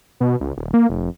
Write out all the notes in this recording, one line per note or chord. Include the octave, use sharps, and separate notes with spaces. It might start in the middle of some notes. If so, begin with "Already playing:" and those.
B2
C#2
D#1
A#3
F1